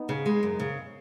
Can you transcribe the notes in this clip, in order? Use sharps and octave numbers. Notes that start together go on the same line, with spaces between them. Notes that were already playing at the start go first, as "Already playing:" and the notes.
Already playing: B3 D#4
C#3
G#3
F#2
C#3